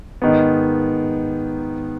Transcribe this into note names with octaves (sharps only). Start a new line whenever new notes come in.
G#2 D#3 B3